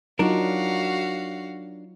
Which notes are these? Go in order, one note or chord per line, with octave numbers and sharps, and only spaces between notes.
F#3 D4 D#4 F4 F#4 A#4 F5